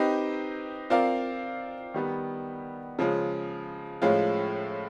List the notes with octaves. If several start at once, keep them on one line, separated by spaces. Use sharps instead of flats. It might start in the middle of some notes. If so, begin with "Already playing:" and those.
Already playing: C4 D#4 G4 B4 D#5
C4 F4 A#4 D5 F5
D#3 G3 B3
C#3 F3 G#3
A2 F3 G#3 C#4 F4